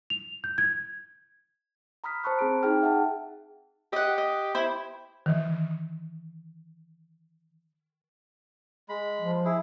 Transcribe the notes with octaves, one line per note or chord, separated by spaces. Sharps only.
F7
G6
G#6
A#5 B5 D#6 F6 B6
C5 A5 B5 C#6 F#6
C4 G#4 A#5 D7
D#4 G#4 G5 F6
E5 F#5 G5 A5
G4 D#5 F#5
D#5
E4 C5
D#3 E3
G#3 B5
F3
E4 G#4